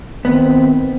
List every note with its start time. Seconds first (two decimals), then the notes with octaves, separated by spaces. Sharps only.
0.25 D#3 B3 C4